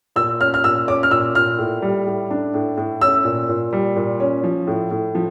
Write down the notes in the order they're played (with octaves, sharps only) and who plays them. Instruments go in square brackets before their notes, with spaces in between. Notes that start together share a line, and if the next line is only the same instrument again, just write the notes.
[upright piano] A#2 E6
C#4 F6
F6
A#2 E6
C#4 D6
F6
A#2 E6
A#2 F6
A2
G3
A2
D4
A2
A2
C#4 E6
A#2
A#2
G3
A#2
C#4
F3
A2
A2
F3